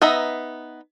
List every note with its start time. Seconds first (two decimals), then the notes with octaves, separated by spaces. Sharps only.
0.02 B3 D#4 D#5 E5 A#5